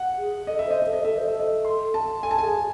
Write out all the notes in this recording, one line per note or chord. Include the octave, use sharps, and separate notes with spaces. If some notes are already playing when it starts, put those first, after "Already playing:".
Already playing: F#5
G#4
A4 D#5
E5
C5 D#5
A4 E5
D#5
A4 E5
C5 D#5
A4 E5
D#5
C6
A5
A4 G#5
A5
G#4 G#5